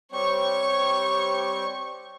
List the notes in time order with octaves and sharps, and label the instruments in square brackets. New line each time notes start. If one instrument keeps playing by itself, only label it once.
[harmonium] G3 C4 G4 [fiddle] C#5 C#6